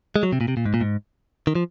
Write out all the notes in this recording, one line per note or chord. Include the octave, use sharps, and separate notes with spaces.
G#3
F#3
C3
A#2
C3
A#2
G#2
A#2
G#2
D#3
F3